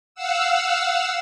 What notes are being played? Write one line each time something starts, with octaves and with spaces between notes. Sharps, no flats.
F5 F#5 E6